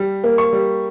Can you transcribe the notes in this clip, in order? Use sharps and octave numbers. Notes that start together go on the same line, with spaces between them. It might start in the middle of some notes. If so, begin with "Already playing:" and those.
Already playing: G3
A#3
C#6
G3